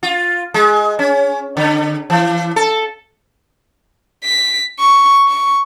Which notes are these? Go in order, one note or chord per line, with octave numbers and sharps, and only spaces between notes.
F4
G#3
C#4
D3
E3
A4
B6
C#6
C#6